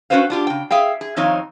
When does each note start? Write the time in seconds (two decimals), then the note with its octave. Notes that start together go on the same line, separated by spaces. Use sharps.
0.10 C#4 D#4 F#4 B4 C5 F5
0.30 D4 F4 G4
0.47 C#3 G5
0.71 G#4 E5 F5 G5
1.01 G#4
1.16 F2 D#3 C4 D#4 C#5 F5